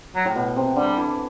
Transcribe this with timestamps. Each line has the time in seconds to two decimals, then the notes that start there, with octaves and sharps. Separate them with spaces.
0.15 F#3
0.25 A2
0.36 B2
0.56 C3
0.76 D3 G3
0.97 E3